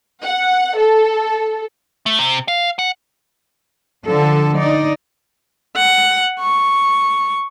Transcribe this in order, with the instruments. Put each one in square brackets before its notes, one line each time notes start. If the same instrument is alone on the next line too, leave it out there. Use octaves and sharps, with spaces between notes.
[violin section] F#5
A4
[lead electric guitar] A3
C3
F5
F#5
[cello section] D3 F3 A4
D#4 D5
[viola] F#5
C#6